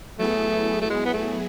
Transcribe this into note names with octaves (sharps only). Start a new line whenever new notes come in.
F#3 A3 B3 E4 G#4
A3
G#3
B3
A3